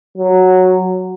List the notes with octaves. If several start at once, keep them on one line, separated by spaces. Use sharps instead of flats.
F#3